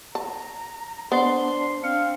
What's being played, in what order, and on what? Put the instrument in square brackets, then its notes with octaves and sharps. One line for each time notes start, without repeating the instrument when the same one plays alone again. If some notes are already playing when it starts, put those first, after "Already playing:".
[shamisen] A5 [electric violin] A#5
[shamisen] B3 [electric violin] D4 [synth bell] C5 D5 [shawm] C6
[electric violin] C4 D4 [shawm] F5 [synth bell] C#7